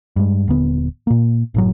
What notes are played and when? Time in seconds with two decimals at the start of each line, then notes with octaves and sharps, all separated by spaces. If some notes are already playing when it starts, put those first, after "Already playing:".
0.16 G2 G#3
0.48 D#1 D3 B3
1.07 A#2 A#3
1.54 F#1 A2 F#3